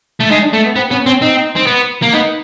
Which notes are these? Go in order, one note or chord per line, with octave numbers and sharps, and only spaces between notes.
A3
G#3 D#4
D4
A3
B3
B3 C4
B3 C#4
C4 C#4
C4 D#4
C4
B3
A#3
B3 D#4